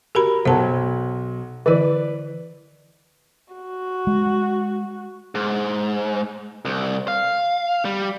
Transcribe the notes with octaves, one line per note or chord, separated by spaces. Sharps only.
F#4 G4 A#4 B5
B1 F#3 C5 A5
D3 E3 E4 B4 D5
F#4
G#3
G#2
C2
F5
G3